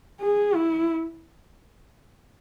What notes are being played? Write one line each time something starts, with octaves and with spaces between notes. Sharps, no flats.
G#4
E4